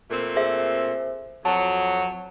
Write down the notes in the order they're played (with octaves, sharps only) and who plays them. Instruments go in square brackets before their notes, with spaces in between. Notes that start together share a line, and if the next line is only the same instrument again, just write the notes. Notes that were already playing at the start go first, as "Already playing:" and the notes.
[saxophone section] A#2 A3 C4
[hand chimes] G#4 C5 E5
[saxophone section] F2 F#3 [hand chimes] A5